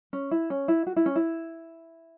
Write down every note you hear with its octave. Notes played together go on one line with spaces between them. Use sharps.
C#4
E4
C#4
E4
F#4
E4
C#4
E4